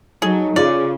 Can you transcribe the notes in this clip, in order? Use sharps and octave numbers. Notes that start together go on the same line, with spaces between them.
F#3 D#4 G#4 A4
C#3 F4 G#4 C#5 D5